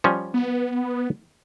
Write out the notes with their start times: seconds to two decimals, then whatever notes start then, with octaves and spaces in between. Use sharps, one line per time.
0.04 F3 G3 C#4
0.34 B3